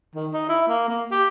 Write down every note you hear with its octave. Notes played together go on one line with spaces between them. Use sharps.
D#3
D#4
E4
A#3
A#3
G4